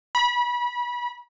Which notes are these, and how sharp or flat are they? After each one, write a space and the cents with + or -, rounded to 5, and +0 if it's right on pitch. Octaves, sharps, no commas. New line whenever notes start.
B5 -30